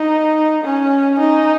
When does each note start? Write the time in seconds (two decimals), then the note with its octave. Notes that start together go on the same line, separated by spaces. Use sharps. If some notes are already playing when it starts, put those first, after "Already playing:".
Already playing: D#4
0.64 C#4
1.20 D#4